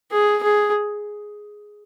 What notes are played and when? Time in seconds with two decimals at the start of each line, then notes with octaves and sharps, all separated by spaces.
0.12 G#4
0.43 G#4